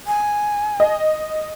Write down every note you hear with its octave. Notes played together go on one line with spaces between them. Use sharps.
G#5
D#5